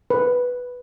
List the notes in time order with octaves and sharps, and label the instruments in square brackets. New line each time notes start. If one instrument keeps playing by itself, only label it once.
[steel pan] B4